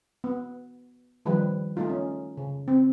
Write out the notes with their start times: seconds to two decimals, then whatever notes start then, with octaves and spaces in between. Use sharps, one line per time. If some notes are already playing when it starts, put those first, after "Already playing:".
0.24 B3
1.26 D#3 F3 G3 B4
1.77 A3 D#4 F4
1.90 C#4
2.37 C#3
2.68 C4